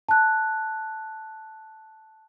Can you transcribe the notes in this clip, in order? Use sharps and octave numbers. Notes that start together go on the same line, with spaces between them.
A5 F#6